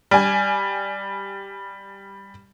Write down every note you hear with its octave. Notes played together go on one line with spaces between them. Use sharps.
G3 G#5